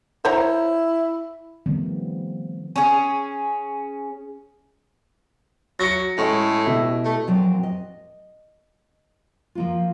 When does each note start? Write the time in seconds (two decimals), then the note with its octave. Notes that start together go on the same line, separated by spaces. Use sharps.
0.25 E4 C5 C#5 A#5
1.66 D#3 F3 G3 A3 B3 C4
2.76 C#4 G#4
5.80 F#3 A#6 C#7
6.17 A2 G#3 C#4
6.65 B2 E4 G4
7.05 A3
7.27 A#2 F3 F#3 C4 D5 G5
7.63 D#5
9.55 F3 A#3 F4